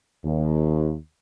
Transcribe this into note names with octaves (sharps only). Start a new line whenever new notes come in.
D#2